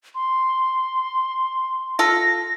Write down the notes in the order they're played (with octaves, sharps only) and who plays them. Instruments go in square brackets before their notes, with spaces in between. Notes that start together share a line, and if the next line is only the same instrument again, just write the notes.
[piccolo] C6
[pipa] F4 A4 [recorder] A#6